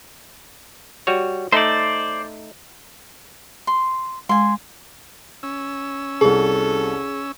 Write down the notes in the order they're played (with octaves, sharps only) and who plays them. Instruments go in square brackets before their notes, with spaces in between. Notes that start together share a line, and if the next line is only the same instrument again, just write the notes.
[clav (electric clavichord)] G3 F#4 C#5
[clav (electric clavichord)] A3 D#4 A4 [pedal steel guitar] C5 D5
[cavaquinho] C6
[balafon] G#3 [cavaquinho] G#5 C6
[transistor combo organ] C#4 E6
[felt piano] C2 C3 [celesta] G#4 [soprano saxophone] A4